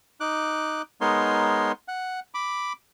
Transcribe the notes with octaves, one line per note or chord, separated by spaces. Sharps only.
D#4 D6 F#6
G#3 B3 D#4 A#4 C#5 C6
F#5
B5 D6